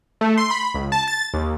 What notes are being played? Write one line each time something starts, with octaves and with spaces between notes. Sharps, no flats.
A3
C6
B5
C#2
A5
A6
D#2